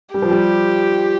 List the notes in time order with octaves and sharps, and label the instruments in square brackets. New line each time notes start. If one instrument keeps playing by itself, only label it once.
[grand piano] G3 [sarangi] G4
[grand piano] F3
G3